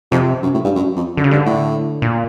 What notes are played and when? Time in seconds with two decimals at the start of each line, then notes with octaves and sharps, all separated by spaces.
0.11 F2 C3
0.43 F#2
0.54 A2
0.64 G2
0.75 F#2
0.96 F2
1.17 F#2 D3
1.24 C#3
1.31 G2 D3
1.46 A2
2.02 A#2